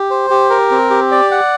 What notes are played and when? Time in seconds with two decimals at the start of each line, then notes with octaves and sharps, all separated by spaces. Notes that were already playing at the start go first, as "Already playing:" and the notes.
Already playing: G4
0.10 C5
0.30 G4
0.50 A#4
0.71 C4
0.90 G4
1.12 D5
1.31 F#5